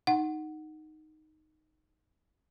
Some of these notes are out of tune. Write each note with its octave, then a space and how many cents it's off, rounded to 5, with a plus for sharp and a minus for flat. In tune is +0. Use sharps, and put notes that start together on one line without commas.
D#4 +0 F#5 +0